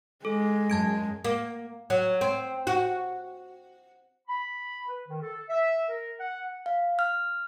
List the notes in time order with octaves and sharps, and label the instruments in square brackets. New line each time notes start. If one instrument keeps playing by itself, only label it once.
[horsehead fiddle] G#3 [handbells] A4
[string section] F#2 [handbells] A5 G#6 D7
[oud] A#3
F#3
C4
F#4
[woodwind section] B5
B4
D#3
A4
E5
A#4
F#5
[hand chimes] F5
F6